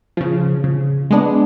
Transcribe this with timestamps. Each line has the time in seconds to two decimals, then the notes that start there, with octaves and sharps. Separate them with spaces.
0.17 C#3 F3
0.64 C#3
1.11 G#3 B3 D4